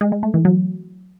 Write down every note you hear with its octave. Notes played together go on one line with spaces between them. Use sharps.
G#3
G#3
A3
E3
F#3